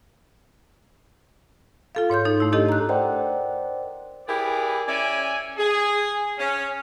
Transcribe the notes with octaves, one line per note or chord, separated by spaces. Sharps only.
F4 A4 F5
G#2 C#5 C6 G6
D#4 A4
A3 E4
D4 E4 G4 A4 D#5
A#5 F#6
A#4 C5 D5 D#5 F#5 G5
E4 G4 G#4 A#4 B4 D5
C#4 D5 E5 G#5
G#4
C#4